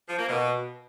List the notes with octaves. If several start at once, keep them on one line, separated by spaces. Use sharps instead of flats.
F3
A#3
B2